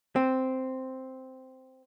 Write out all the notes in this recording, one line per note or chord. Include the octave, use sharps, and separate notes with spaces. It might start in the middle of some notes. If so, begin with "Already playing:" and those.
C4